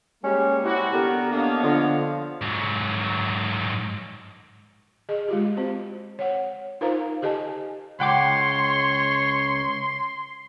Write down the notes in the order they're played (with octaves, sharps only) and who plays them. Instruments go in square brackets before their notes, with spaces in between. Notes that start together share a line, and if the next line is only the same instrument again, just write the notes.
[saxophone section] G3 G#3 A#3 [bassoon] C#4
[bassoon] C3 [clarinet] E4 [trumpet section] F#4
[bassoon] D3 [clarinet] B3 [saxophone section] G4 A#4
[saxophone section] A#3 D4 [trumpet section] C#5 D#5 F5
[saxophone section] D3 [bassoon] F3
[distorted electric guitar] G#2 F#3
[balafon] G#4 D#5
G#3 F4 G4
C4 F#4 C5
C#5 F#5
D#4 F4 A#4 C5 F5 A#5
G4 A4 D#5 G#5 A5
[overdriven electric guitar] C#2 [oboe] C#5 [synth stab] F#5 G5 D6 [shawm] C6